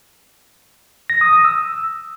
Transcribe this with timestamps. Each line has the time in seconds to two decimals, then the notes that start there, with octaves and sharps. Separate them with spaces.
1.10 A#6
1.21 D#6
1.33 D#6
1.45 E6